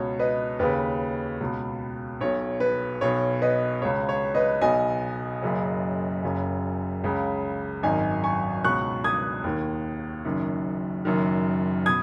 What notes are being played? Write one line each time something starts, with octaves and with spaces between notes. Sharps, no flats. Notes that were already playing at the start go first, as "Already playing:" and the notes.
Already playing: C#2 B2 C#5
B4 D#5
D#2 C#3 B4
C#2 B2
B1 B2 C#5
B4
B1 B2 C#5
B4 D#5
C#2 C#3 C#5
C#5
B4 D#5
B1 B2 D#5 G#5
F#1 F#2 C#3
F#1 F#2 C#3
C#2 C#3
G#1 F#2 D#3 D#5 G#5
G#5 C#6
C#2 B2 C#6 F#6
D#6 G#6
D#2 D#3
F#1 F#2 D#3
F#1 F#2 D#3
B2 D#6 G#6